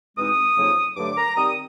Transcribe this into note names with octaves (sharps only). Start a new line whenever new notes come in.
E2 B2 G#3 C4 D#4 D#6
F2 C#3 F#3 A#3 D#4
G2 D3 F#3 A3 D6
A#5
D#3 G3 C4 D#6